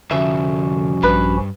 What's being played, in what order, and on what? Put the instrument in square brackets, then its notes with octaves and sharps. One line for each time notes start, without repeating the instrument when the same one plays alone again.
[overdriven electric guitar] C2 F2 [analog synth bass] D3 [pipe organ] F3 C#4 F#4 [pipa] E5
[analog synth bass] A#1 [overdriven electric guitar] G2 [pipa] B4